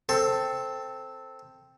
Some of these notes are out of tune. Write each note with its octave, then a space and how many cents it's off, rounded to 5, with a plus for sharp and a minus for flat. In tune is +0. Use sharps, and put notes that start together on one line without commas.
C4 +0 A4 +15